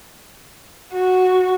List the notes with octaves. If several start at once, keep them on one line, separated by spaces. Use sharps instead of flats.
F#4